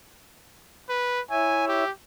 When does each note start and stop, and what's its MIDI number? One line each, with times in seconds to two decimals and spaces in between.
0.89 1.21 71
1.31 1.84 64
1.31 1.84 73
1.31 1.84 76
1.31 1.68 80
1.68 1.91 67